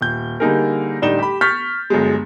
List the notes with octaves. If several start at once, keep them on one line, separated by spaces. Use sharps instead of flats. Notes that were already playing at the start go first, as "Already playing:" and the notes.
D#1 G6
D3 G3 A#3 D#4 G#4 A#4
D1 G3 D4 D#4 E7 G7
G4 B5
C#6 F6 G6 A6 B6
G1 F#3 G#3